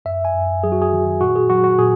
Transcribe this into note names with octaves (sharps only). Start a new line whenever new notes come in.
F#2 E5
G#5
F#2
F#3 G#4
F#4
G#4
D#3
A#2 F#4
G#4
F#3 F#4
F#4
A#2 G#4